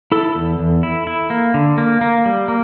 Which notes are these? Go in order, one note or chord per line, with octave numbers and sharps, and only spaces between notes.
E4 A4
E2
E2
E4
E4
A#3
D3
A#3
A#3
G3
A#3